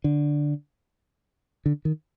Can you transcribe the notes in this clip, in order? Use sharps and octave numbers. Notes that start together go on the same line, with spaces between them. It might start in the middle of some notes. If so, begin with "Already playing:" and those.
D3
D3
D#3